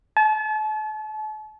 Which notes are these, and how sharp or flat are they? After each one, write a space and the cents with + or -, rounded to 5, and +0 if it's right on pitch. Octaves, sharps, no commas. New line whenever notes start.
A5 -40